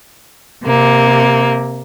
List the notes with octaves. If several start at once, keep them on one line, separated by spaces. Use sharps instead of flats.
C3 A#3